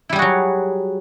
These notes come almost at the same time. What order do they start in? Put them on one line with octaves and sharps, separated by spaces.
E4 G3 G#4 F#4 F#3